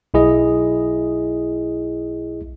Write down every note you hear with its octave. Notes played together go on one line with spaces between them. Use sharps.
B1 E4 G#4 D#5